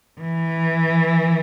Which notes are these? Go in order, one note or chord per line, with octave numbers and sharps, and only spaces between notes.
E3